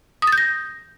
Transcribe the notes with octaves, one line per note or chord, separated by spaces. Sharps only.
D#6
A6
G6
A#6